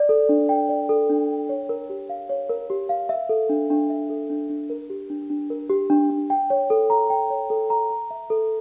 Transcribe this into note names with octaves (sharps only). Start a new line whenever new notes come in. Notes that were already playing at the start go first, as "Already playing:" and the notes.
Already playing: D5
A4
D4
G5
D5
A4
D4
G5
C#5
A#4
G4
F5
C#5
A#4
G4
F5
E5
A4
D4
D4
E5
A4
D4
D4
A#4
G4
D4
D4
A#4
G4
D4
D4
G5
C#5
A4
A#5
G5
C#5
A4
A#5
A#5
E5
A4